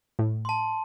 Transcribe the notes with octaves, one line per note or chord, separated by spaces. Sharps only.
A2
A5 C6